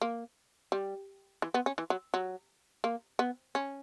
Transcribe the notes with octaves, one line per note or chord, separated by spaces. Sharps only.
A#3
G3
E3
B3
C#4
E3
F#3
F#3
A#3
B3
C#4